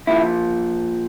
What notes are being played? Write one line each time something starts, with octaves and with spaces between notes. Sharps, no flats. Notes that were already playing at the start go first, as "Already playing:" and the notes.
A#2 F3 E4